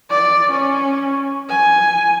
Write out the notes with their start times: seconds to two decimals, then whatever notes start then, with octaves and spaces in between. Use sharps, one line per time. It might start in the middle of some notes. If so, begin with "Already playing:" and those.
0.10 D5
0.51 C#4
1.49 G#5